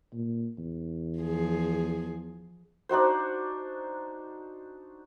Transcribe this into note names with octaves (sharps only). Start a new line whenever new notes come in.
A#2
E2
F3 G#4
D4 D#4 F#4 C5